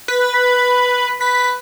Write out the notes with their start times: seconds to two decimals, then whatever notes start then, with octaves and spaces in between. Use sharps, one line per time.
0.08 B4
0.34 B5
1.21 B4 B6